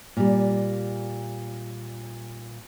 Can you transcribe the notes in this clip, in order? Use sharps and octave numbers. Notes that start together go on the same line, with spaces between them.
A#2 G3